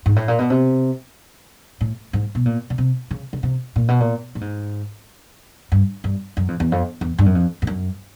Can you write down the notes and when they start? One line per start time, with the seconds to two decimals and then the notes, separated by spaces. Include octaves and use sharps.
0.06 G#2
0.16 A2
0.28 A#2
0.39 B2
0.50 C3
1.81 A2
2.13 G#2
2.35 B2
2.46 A#2
2.70 C#3
2.78 C3
3.11 C#3
3.33 C#3
3.43 C3
3.76 A#2
3.88 B2
4.00 A#2
4.35 A2
4.41 G#2
5.72 G2
6.04 G2
6.37 F#2
6.48 F2
6.60 E2
6.72 F2
7.01 E2
7.18 G2
7.26 F#2
7.35 F2
7.62 G2
7.67 F#2